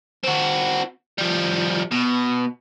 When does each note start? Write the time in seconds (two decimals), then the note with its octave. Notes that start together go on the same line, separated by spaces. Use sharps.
0.24 C4 F#4
1.18 F3 G3
1.92 B2